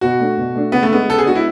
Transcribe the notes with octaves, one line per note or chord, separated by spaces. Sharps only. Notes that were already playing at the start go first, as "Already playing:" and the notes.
B2 F#4
A3 D4
B2
A3 D4
C#3 B3
A3
G#3 B3 D4
C#3 A4
G#4
G#3 D4 F#4
E4